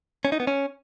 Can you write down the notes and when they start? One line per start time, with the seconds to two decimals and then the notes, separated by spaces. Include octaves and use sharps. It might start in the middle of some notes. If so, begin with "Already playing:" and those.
0.25 C#4
0.32 D#4
0.40 B3
0.47 C#4